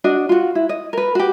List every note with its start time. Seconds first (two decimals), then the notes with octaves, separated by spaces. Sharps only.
0.04 D4 F#4 D#5
0.29 F4 F#4
0.55 E4
0.69 D#5
0.93 A#4 B4
1.15 F#4 G4